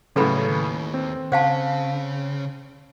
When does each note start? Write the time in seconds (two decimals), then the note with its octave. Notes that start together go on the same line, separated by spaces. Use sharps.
0.16 A2 C#3 F#3 G3 A4 B4 B5
0.48 D#2
0.94 C4
1.32 C#3 C5 F5 A5